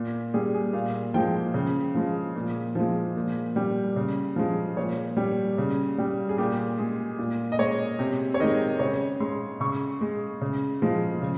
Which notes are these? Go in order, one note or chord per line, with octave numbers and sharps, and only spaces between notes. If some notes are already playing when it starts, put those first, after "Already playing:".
Already playing: A#2
G3 G#4
G#4
A#2 F5
F3 G#3 G5
C#3
F3 G#3
A#2
F3 G#3
A#2
G3
C#3
F3 G#3
A#2 C#5
G3
C#3
G3
G#4
A#2 G4
G#3 G#4
A#2
D#5
G#3 C#5
C3
C#5
D#3 G#3 D#5
C#3 C#5
G#3 C6
C#3 C#6
G#3
C#3
F3 G#3
C#3